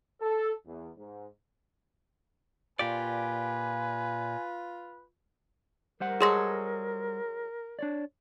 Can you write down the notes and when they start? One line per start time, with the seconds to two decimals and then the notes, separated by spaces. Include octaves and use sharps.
0.20 A4
0.65 E2
0.97 G#2
2.79 A#2 F4 G4 B4 D5 G#5
6.00 G3 A#4 C5 F#5
6.21 F#3 G#3 G#4 A4 C6 A#6
7.79 D4 C#5 D5